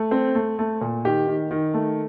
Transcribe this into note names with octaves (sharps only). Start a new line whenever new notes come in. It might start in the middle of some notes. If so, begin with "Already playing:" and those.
Already playing: A3
C4
A3
A3
A#2
D#3 G4
D#3
D#3
A3